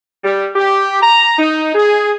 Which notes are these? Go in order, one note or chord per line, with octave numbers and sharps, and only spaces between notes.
G3
G4
A#5
D#4
G#4